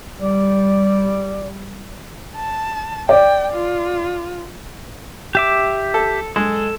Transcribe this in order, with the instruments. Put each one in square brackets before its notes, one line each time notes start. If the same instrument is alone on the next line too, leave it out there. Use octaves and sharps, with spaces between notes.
[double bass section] G3 [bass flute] D5
[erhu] A5
[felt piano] D5 [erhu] G5
[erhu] F4
[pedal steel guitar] G4 E5 D6
[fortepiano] A4
[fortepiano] G#3 [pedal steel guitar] A4